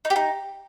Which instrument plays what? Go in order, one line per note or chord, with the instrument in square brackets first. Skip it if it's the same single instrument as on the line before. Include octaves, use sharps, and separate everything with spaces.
[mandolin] D#4
G4
D#4